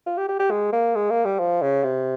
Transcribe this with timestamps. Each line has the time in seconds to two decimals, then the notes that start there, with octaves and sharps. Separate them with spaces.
0.06 F4
0.17 G4
0.28 G4
0.39 G4
0.51 G#3
0.72 A#3
0.95 G#3
1.10 A#3
1.25 G3
1.39 F3
1.62 C#3
1.84 C3